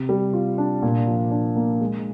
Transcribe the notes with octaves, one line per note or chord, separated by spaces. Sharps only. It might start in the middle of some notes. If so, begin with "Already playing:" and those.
Already playing: C3
G3
F4
D4
A#2
F3
D4
A#3
G#3